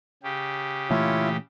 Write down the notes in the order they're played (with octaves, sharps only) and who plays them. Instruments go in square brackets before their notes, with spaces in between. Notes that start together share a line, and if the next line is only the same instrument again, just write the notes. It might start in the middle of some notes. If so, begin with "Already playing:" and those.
[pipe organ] C#3 G4
[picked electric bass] A#2 E3 A3 [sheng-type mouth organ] E4 F4 C#5